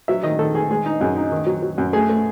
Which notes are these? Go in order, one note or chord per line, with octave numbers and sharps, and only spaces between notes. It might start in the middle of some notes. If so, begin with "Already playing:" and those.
F#3 E5
D#3 D#5
D#3 A4
D#3 G#4
G#3 G#4
D#4
F#2 G#4
D#4
D#3
F#3
F#3
F#2
A3 G#4
A3